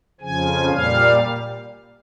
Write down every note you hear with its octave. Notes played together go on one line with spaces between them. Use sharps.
F2 C#3 F3 G#5
A#2 G3 F5